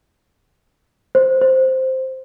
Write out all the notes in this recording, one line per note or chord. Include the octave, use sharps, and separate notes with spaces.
C5
C5